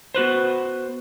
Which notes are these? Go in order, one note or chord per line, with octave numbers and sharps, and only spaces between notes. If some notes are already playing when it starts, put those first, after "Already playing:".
B3 F#4 B4 C5